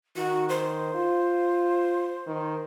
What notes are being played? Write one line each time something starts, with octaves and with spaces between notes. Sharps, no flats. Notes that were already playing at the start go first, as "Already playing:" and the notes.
D#3 F#4
C5
F4
D#3